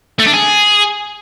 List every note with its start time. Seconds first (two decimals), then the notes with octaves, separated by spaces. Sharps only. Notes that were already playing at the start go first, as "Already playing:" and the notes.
0.19 A3
0.27 D4
0.34 G#4